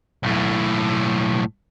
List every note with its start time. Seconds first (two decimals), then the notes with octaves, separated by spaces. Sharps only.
0.24 B1 A2